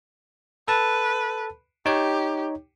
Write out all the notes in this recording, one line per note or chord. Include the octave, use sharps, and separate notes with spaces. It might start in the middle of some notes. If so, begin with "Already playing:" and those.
A4 B4 A5
D#4 G4 C#5